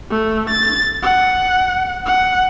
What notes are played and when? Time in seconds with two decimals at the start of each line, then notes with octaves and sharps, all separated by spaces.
0.11 A3
0.50 A6
1.02 F#5
2.06 F#5